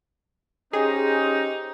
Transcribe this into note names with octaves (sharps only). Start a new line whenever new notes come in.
C#4 D#4 G4 G#4 C5 D#5